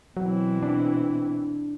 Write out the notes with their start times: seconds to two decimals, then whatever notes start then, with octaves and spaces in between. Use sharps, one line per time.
0.17 B2 E3 F#3 C4
0.63 D4